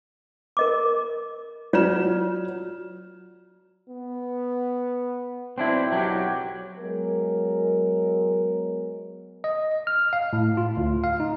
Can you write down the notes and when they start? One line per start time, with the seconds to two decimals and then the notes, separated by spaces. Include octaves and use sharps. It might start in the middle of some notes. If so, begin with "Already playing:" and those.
0.57 A#4 D#5 D6
1.73 F#3 F4 C#5 D5 F6 E7
3.89 B3
5.58 B1 C4 D4 E4
5.92 F#3 G4
6.79 F#3 G#3 B3 A#4
9.44 D#5
9.87 F6
10.13 F5
10.33 A2
10.57 F4
10.77 D2
11.04 F5
11.20 D#4